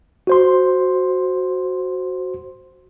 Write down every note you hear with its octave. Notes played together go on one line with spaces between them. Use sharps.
F#4 C5 C6